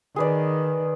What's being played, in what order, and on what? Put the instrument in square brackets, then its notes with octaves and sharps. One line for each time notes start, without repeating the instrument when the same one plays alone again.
[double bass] D#3 [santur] G#4 B4 D5